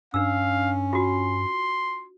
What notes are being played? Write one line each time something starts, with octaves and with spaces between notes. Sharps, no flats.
G2 C#4 D4 F5 E6
F4 F#4 C6